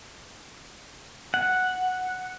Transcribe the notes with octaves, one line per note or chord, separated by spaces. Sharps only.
F#5